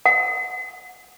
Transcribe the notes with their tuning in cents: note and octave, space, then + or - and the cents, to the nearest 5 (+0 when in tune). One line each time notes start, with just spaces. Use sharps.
F#5 -20